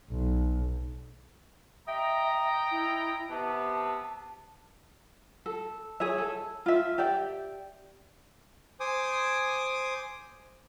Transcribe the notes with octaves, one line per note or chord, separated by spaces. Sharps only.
B1
D#5 E5 G5 A#5
E4
C3 B3 A5
A4
G#4 C#5 E5
A4
F4 E5
G4 D5 E5 G5
C5 G#5 D6 D#6